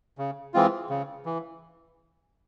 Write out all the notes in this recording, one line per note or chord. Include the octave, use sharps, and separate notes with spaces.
C#3
E3 G#3 C4 F4
C#3
E3